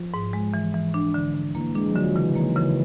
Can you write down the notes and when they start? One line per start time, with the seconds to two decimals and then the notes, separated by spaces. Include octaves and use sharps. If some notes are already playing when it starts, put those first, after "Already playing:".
Already playing: F3
0.14 G#2
0.33 G#3
0.54 E3
0.74 E3
0.94 D4
1.14 D3
1.34 D3
1.55 E3 A#3
1.75 G#3 D4
1.89 F3
1.95 D3 F#3
2.16 C#3 E3
2.35 D#3 A#3
2.56 C#3 E3